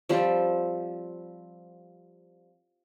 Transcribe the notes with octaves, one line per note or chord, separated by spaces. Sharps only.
F3 G3 C4